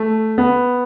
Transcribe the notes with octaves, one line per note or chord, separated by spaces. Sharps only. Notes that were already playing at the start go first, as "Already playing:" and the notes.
Already playing: A3
B3